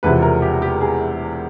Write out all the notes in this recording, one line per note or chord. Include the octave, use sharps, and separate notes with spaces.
E1 E2 C3 F3 B4
A#4
G4
G4
G#4